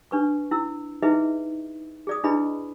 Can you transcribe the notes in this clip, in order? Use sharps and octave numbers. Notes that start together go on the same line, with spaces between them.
D4 B4 C#6
E4 E6
D#4 E4 G#4 B4 D#5 E5
G#4 D5 D#6
D4 E4 G#4 B4 D#5 B5